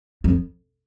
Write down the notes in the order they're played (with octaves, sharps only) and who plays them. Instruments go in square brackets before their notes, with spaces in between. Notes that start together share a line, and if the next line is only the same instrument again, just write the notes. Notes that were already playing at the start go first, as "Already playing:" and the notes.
[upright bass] F2